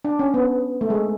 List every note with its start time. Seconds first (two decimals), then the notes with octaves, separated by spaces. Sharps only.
0.05 D4
0.19 C#4
0.34 B3
0.81 A3
0.90 G#3